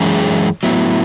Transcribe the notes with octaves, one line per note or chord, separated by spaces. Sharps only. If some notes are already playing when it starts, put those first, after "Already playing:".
Already playing: F#2 E3 G#3 C#4 G#4
A2 F#3 B3 E4